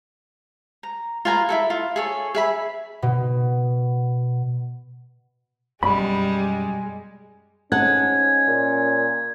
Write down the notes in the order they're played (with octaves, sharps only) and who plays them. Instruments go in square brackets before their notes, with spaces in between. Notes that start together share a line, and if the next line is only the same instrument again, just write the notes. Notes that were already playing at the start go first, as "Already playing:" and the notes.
[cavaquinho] A#5
F4 B4 G#5 A#5
E4 G#4 A4
F4
G#4 A4 C#5
G#4 E5 B5
[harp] B2
[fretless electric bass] F#2 B2 [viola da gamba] G3 [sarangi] G#3 [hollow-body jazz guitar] B5
[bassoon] G#2 [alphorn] C#4 [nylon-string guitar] D#5 F#5 A5 [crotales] G#6
[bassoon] A#2